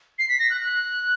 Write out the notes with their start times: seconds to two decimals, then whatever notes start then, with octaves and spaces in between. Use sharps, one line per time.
0.19 C7
0.29 B6
0.39 A#6
0.50 F#6
0.61 F#6